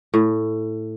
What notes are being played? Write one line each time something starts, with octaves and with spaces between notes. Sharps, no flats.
A2